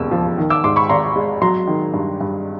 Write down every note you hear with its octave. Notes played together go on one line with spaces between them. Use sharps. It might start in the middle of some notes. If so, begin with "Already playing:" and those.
Already playing: E1 D#2 C#3 E6
F3
D#3
D6 E6
G#2 C6 D6
B5 C#6
G#1 A#5 C6
G#3
F#3 A#5 C6
D#3
G2
G2